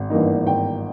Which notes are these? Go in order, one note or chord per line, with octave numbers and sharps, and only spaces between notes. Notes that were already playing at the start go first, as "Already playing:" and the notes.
Already playing: G#1
G2 E3 A#3 D#4
G#1 G5